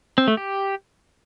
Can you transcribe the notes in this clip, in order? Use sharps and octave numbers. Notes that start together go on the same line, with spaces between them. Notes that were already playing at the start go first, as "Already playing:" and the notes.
C4
A3
G4